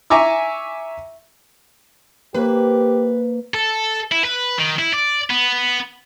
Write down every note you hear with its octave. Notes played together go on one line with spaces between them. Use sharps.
E5 G#5 A#5 C#6 D6 E6
A#3 G4 B4 C5
A4
E4
B4
D#3
E4
D5
B3